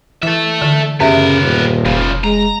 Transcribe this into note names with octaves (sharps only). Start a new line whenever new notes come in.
E3 A4 E5
D3
F#2 C#3 B3 G4 A#4 E5
D#1
F1 C#3 F3
G#3 A#5